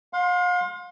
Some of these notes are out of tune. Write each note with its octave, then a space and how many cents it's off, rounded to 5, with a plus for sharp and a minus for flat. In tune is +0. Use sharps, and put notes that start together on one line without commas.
F5 +40 C6 +10